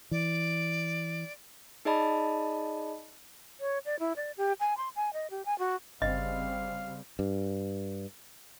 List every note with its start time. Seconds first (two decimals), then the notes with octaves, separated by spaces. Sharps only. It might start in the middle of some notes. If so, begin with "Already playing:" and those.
0.11 E3 D5
1.85 D#4 G#4 D5 D#5 A5 B5
3.60 C#5
3.85 D5
3.99 E4
4.16 D5
4.37 G4
4.60 G#5
4.77 C6
4.96 G#5
5.13 D#5
5.30 G4
5.45 G#5
5.59 F#4
6.02 G1 C#3 G3 C4 D#5 F5
7.19 G2